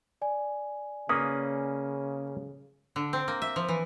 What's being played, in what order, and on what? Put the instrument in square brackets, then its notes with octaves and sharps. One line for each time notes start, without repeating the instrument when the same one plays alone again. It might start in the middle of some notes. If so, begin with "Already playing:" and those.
[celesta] D5 G#5
[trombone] C#3 [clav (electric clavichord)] A#3 C#4 B4 [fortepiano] D#6
[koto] D3
C4
A#3
E5
F3
E3